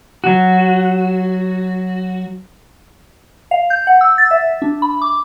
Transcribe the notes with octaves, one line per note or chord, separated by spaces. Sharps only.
F#3 F#4
F5
G6
F#5
E6
A6
E5
D4
B5
D6